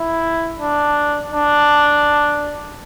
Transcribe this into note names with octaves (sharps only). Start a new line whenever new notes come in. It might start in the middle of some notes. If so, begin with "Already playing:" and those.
Already playing: E4
D4
D4